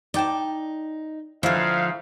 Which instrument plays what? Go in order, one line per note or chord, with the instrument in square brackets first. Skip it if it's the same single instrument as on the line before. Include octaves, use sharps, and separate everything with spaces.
[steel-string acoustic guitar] D#4 [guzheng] D5 G5 A5
[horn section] G#2 F5 [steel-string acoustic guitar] D3 F3 [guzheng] E4